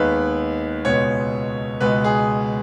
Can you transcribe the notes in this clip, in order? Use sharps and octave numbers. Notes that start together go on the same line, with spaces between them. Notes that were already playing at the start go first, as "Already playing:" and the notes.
Already playing: D#2 D#3 G#3 B3 B4
C#2 B2 G#3 B3 C#5
C#2 B2 G#3 B3 B4
G#4